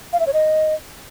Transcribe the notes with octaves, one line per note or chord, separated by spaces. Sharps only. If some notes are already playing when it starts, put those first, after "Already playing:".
F5
E5
C#5
D#5